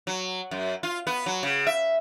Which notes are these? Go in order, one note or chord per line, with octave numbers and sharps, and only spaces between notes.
F#3
F#2
F4
B3
F#3
C#3
E5